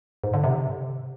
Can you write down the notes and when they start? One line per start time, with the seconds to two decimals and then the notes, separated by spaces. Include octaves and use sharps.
0.24 G#2
0.34 D3
0.44 C3